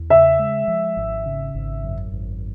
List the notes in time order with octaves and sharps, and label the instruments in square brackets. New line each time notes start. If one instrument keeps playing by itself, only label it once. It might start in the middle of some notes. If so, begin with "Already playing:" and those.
Already playing: [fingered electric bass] E2
[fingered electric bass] C#3 [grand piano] E5
[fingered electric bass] G#3
F3
G#1
C#3
G#1
F#2
G#1